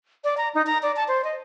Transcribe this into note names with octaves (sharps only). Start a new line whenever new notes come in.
D5
A#5
D#4
A#5
D5
A5
C5
D#5